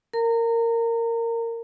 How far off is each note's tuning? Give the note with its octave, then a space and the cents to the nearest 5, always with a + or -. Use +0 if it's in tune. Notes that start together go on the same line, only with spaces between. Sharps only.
A#4 -15 A#5 -30